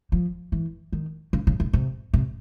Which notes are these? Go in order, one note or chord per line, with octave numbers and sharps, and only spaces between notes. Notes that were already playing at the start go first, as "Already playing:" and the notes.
F3
E3
D#3
C#3
C#3
C3
C3
C3